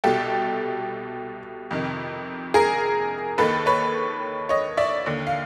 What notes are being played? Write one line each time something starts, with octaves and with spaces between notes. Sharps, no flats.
C2 B2 G4 A4
F2 C3 D#3
G#4 A#4
D#2 D#3 A4 B4
B4 C#5
C#5 D#5
D5 E5
D#2 D3
F5